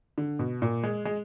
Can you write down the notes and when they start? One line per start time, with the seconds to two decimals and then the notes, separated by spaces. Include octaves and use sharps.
0.18 D3
0.39 B2
0.62 A#2
0.83 G#3
1.05 G#3